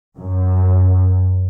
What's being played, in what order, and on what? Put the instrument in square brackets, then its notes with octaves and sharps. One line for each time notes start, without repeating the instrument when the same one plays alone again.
[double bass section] F#2